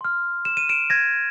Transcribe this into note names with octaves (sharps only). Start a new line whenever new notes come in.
C6 F6
E7
D#7
D7 E7
G#6 A#6